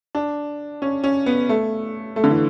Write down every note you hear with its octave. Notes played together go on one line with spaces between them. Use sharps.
D4
C#4
C#4
B3
A3
A3
D3
E3